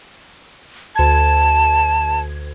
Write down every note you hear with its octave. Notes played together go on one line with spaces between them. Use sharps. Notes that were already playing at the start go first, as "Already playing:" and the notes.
D2 A5 G#6